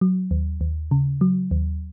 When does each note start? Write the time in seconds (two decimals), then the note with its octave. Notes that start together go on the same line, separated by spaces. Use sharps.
0.01 F#3
0.31 D#2
0.61 D#2
0.91 C#3
1.21 F#3
1.51 D#2